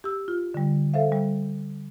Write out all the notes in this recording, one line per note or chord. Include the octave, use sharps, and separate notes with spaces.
G4 E6
F4
D3 G3
A4 C5 E5 F5
G3